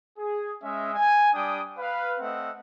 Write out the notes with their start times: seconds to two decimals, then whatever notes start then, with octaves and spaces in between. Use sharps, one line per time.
0.18 G#4
0.62 G#3 C#4 D#5 E5
0.94 G#5
1.34 G3 D4 G5 D#6
1.79 B4 F5
2.19 A3 C4 D#5 E5 F#5